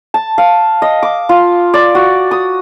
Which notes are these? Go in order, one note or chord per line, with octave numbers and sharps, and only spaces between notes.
A5
F5
D#5
D6
F4
D5
F#4
D#6